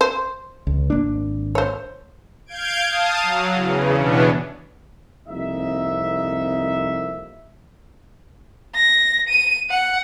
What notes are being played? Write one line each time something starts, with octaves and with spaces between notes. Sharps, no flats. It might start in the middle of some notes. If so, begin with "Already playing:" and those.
C5
C#2
G#1 A#3 D4
C5 C#5
F5 G6 G#6 D7
F5 A5 D#6
F#3
E2 C#3
B2 E3 B3 C#4 D4
C2 F2 A#3 D#4 E5
A#6
D#7
F#5